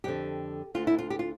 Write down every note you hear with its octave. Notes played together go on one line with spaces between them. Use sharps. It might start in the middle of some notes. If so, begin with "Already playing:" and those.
F2 D3 G4
D2 D3 F4
E4
F4
G4
F4